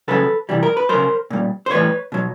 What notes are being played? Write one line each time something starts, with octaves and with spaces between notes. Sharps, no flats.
C#3 F#3 A4 B4
C3 E3 G3
A#4
B4
C#3 F#3 A#4 C5
A#2 G3
C5
A2 E3 G3 B4 C#5
B2 F#3